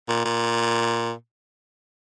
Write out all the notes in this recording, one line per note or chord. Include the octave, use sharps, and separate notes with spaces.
A#2
A#2